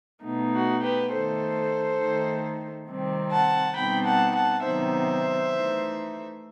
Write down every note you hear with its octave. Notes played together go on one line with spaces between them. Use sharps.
B2 A3 D#4
F#4
G4 B4
D#3 A3 D#4 A4 C5
D#3 A3 D#4
C3 D#3 G3 C4
F#5 A5
B2 G3 C4 D#4 G5 B5
F#5 A5
F#5 A5
C3 D#3 F#3 B3 D#4 C5 E5
E3 A3 D#4